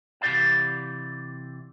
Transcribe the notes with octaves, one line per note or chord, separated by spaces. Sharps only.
C3 E3 G4 D5 F5 F#5